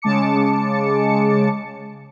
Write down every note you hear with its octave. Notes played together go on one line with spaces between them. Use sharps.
C#3 G#3 A5 D6 C#7